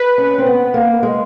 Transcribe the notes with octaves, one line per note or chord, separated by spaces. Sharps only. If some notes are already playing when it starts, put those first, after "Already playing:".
Already playing: B4
C#4
C4
B3
A#3
G#3